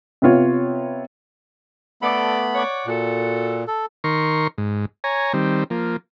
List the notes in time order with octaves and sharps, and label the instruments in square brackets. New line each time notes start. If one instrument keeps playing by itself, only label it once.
[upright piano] C3 B3 F4 C#5
[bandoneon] A3 B3 B5 [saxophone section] A4 D5
[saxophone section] C#5 D5 F#5
[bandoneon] A#2 [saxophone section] F#4 A4
[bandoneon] A4
[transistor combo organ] D#3 A#4 C6 C#6
G#2
C#5 G#5 A#5
D#3 G3 C4
F3 A#3